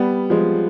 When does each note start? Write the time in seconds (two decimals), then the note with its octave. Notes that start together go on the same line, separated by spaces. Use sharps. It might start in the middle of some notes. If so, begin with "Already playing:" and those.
Already playing: G3 B3
0.30 F3 G#3